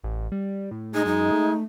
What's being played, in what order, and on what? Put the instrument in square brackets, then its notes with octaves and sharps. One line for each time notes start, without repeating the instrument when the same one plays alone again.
[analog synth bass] A1
G3
A2
[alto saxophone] G#3 [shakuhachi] D#4
[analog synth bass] F#2 [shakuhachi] D#4
[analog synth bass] A3